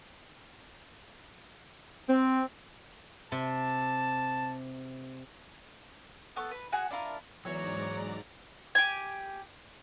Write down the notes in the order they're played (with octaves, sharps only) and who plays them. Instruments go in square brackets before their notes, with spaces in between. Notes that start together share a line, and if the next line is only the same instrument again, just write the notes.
[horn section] C4
[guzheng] C3 [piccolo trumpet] A5
[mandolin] B3 A4 C#6
B4
F#4 G#4 F#5 G#5
D4 E4 F4 A#4
[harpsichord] E2 [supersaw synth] G#2 D5 A#5 [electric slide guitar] F#3 [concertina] C#5
[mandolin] G4 G#5